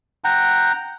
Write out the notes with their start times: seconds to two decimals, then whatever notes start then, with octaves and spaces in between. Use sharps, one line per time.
0.24 F#5 G5 A#5